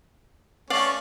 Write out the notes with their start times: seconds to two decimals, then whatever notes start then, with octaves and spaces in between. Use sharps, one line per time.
0.70 A3 C#4 D5 F5 D6